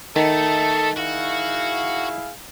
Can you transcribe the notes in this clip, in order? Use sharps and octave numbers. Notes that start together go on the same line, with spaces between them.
D#3 A3 A4 D#5 A5
E4 F#4 G#4 F5